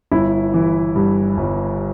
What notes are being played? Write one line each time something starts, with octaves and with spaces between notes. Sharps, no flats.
G1 E4
E3
G2
G1